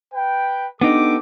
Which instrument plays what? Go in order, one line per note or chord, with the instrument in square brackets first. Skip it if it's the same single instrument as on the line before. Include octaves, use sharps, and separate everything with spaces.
[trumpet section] B4 G5
[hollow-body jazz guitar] B3 D4 D#4 [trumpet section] G4 A4 D6